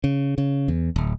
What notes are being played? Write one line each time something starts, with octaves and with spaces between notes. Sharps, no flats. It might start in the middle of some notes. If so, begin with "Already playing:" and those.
C#3
C#3
E2
D1